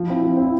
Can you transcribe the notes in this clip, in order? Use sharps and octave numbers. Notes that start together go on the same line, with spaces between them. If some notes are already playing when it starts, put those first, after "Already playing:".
Already playing: F3
C4 E4
F3
C4 E4